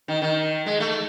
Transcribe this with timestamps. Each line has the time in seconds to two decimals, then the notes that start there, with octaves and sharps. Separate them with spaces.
0.08 D#3
0.22 D#3
0.66 G#3
0.80 A3